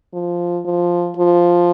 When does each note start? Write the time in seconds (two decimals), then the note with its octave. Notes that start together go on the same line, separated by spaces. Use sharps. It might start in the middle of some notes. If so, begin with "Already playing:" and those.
0.13 F3
0.65 F3
1.17 F3